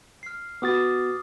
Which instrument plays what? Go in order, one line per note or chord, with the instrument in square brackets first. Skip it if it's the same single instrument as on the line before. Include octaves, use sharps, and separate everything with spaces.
[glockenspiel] F6 C7
[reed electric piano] B3 F#4 A6 [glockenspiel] D6 D#6